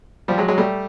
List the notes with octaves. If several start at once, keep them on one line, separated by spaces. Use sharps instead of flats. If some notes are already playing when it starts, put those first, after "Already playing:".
F3 G3
F#3 G#3
F#3 G#3
G3 A3